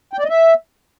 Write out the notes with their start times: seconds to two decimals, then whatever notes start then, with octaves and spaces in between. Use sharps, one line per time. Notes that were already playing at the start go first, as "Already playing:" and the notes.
0.13 G5
0.19 D5
0.24 D#5
0.29 E5